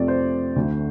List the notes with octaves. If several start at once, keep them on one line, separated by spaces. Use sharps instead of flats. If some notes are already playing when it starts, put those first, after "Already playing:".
Already playing: F2 C3 F3 A3 D5
C5
D2 D3 A3